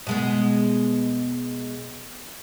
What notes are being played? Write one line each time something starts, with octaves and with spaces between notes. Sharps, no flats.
B2 G#3 B3